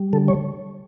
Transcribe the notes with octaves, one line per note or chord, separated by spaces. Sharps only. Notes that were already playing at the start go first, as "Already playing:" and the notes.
Already playing: G3
D3 A4
C#5